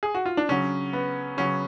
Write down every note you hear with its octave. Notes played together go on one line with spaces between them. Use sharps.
G#4
F#4
F4
D4
C#3 F#3 C#4
B3
C#3 F#3 C#4